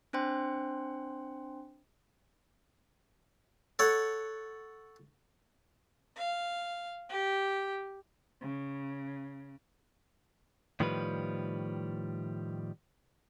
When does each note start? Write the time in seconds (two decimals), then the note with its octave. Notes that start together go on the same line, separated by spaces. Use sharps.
0.13 C4 D4 C5 G5 C6
3.79 A4 C#5 F#5
6.16 F5
7.10 G4
8.40 C#3
10.80 A2 D#3 F3 G3 B4